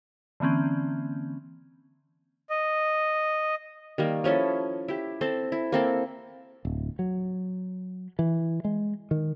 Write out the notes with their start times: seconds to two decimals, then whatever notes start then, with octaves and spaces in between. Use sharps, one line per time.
0.40 D3 E3 A#3 C4 C#4
2.50 D#5
3.98 D#3 G3 A#3
4.24 F3 C#4 E4 A4
4.88 E4 G4
5.21 C4 A4 C5
5.52 E4
5.72 A#3 C4 A4
6.65 D1
6.99 F#3
8.19 E3
8.64 G#3
9.11 D#3